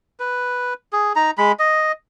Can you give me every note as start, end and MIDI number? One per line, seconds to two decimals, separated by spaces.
0.20 0.74 71
0.93 1.13 68
1.16 1.31 63
1.16 1.31 82
1.38 1.52 56
1.38 1.52 83
1.59 1.92 75